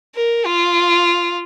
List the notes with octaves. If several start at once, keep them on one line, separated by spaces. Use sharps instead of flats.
A#4
F4